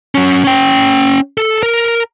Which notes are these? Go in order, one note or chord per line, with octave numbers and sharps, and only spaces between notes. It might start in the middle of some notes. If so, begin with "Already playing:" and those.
F#3 C#4
C#4 G5
A4
A#4